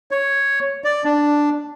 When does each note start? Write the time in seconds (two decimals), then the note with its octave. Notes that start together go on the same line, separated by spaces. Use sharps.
0.11 C#5
0.84 D5
1.04 D4